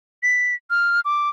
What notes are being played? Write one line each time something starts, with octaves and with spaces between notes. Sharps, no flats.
B6
F6
D6